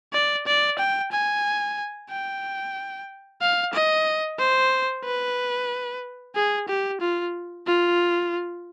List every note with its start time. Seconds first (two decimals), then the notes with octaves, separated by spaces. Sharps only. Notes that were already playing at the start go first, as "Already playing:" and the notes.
0.13 D5
0.47 D5
0.79 G5
1.11 G#5
2.10 G5
3.42 F5
3.73 D#5
4.39 C5
5.05 B4
6.36 G#4
6.68 G4
7.01 F4
7.67 F4